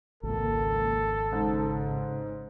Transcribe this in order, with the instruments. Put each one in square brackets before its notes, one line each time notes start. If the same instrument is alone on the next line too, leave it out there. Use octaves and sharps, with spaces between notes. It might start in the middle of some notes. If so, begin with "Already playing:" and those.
[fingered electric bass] G#1 [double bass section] C#2 F3 A#3 [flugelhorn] A4
[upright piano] G#2 [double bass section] C#3 G#3